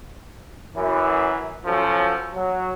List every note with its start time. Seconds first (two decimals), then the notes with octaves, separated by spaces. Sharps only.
0.76 F#2 E3
1.65 F3 F#3 C#4 A4
2.34 F#3